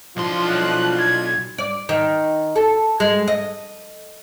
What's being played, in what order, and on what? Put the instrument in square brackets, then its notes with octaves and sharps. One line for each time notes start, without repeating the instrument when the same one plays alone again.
[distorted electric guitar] B1 C6 [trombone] F3 [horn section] D4 E4 F4
[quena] F#6
G#6
[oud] D5
D#3
A4
G#3
D#5